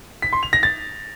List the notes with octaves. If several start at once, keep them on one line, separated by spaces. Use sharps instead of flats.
B6
C6
F7
A#6
A6